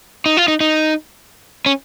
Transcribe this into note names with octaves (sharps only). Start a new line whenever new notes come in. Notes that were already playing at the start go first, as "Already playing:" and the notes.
D#4
F4
D#4
D#4
C#4